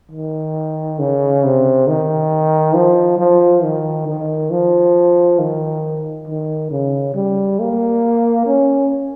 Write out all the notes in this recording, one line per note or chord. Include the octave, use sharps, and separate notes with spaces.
D#3
C#3
C3
D#3
F3
F3
D#3
D#3
F3
D#3
D#3
C#3
G3
A#3
C#4